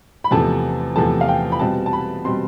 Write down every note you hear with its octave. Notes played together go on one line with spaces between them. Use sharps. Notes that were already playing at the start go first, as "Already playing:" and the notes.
B5
E2 C3 F3 A3 A5
E2 C3 F3 A3 A5
F5
G5
B5
B2 G3 C4 A5
A5
B5
B2 G3 C4 C6